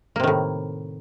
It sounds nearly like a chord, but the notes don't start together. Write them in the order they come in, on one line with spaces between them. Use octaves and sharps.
A#3 C3 D#3 A2